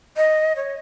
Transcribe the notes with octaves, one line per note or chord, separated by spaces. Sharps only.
D#5
C#5